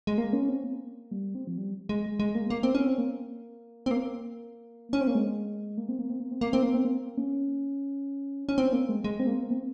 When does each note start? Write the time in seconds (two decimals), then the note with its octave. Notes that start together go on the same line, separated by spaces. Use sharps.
0.07 G#3
0.18 A#3
0.33 C#4
0.49 C4
0.64 A#3
1.11 G3
1.35 C4
1.47 F3
1.58 G3
1.89 G#3
2.20 G#3
2.35 A#3
2.50 A#3
2.63 C4
2.75 C#4
2.86 C4
2.98 A#3
3.86 C4
3.91 A#3
4.93 C#4
5.01 C4
5.07 A#3
5.15 G#3
5.78 A#3
5.89 C4
5.99 A#3
6.10 C4
6.20 A#3
6.31 C4
6.41 A#3
6.53 C4
6.63 A#3
6.74 C4
6.85 A#3
7.18 C#4
8.49 C#4
8.58 C4
8.73 A#3
8.89 G#3
9.04 G#3
9.20 C4
9.27 A#3
9.51 C4